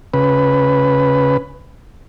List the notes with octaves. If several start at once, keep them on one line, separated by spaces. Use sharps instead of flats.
C#3 B4